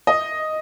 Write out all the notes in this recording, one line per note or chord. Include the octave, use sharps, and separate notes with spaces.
D#5